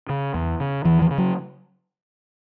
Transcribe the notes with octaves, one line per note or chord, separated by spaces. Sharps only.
C#3
E2
C#3
E2 E3
E3
C#3
F#3